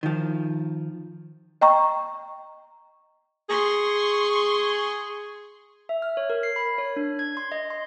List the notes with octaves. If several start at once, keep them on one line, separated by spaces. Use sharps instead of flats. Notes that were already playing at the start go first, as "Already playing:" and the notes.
D#3 F3
D#5 G5 A#5 C#6
G#4 C6 C#6
E5
F6
C#5
A#4
C7
B5
C#5
D4
G#6
C6
D#5
C6